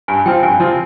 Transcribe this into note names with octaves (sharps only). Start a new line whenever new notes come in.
G2 G#5
F3 C4 F4 G5
G2 G#5
F3 C4 F4